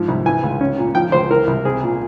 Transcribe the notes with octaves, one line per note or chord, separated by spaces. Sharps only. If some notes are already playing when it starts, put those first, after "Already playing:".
Already playing: G#2 F3
C2
E3 G#5
C#2
C#4
A#2
F3 G5
C#2 C5
E3 A#4
C2
C4 G#4
A#2